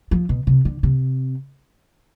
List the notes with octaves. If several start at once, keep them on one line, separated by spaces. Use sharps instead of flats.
F3
B2
C3
D3
C3